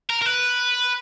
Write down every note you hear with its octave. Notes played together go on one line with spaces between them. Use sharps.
A#4
A#4
B4